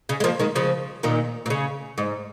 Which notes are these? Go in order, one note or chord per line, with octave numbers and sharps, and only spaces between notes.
C#3
G#3
F3 A#3
D#3 G#3
C#3 F3
A#2 D#3
A#2
C#3
G#2